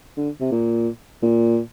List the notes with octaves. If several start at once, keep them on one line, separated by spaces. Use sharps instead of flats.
D3
C3
A#2
A#2